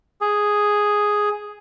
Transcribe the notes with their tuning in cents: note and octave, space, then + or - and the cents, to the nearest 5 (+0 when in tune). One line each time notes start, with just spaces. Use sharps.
G#4 +0